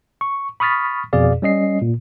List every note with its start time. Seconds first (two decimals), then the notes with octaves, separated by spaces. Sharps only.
0.21 C#6
0.60 B5 C#6 D#6 F6 A6 B6
1.13 F2 B2 G#4 D5 F5
1.42 G3 C#4 D#5 C7
1.82 A#2